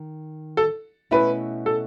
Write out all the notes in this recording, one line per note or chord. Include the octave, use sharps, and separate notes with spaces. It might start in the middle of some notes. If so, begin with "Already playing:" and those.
Already playing: D#3
A4
B2 A3 C#4 E4 B4
A4